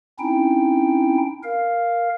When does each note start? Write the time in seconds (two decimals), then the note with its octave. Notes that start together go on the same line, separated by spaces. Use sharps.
0.19 C4 C#4 D#4 E4 G5
1.43 A#4 F5